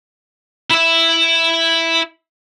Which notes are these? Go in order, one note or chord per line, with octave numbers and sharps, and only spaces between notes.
E4 E5